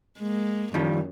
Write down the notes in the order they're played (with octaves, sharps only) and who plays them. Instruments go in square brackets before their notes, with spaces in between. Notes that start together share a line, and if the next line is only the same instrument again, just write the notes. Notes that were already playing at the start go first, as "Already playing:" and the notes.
[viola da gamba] G#3 A#3
[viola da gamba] F#2 [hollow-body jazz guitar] D#3 F3 G3